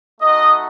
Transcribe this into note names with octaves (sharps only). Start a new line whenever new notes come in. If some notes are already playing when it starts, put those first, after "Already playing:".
A3 D#4 F#4 D#5